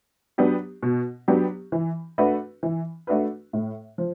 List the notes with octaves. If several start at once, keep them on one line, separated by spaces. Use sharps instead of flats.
F#3 B3 D4 G4
B2
F#3 B3 D4 G4
E3
A3 D4 F#4 B4
E3
A3 D4 F#4 B4
A2
F3